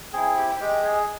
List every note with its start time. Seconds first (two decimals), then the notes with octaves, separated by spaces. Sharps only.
0.13 C4 E4 G#4
0.37 G4
0.60 G#3 G4
0.84 G#4